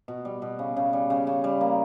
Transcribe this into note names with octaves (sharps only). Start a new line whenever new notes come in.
B2
G3
B2
C#3
C#3
G3
C#3
C#3
G3
A#3